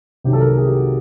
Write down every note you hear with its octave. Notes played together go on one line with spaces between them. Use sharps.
C2 C3 D#3 F#3 G4
A4
A#4
A4
G#4
G4
F#4